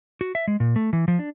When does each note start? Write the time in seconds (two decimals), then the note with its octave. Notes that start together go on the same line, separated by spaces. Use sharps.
0.21 F#4
0.35 E5
0.48 G#3
0.60 A#2
0.76 A3
0.93 E3
1.08 F3
1.19 D4